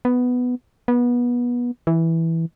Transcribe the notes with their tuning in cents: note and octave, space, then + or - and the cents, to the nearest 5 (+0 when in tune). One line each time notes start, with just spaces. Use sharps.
B3 +5
B3 -25
E3 -5